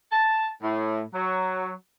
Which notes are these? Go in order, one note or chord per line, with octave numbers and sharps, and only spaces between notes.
A5
A2
F#3